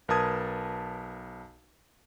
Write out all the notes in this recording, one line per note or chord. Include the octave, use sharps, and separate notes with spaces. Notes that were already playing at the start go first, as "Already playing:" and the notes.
B1 A#4 B4 A5 D#6 G#6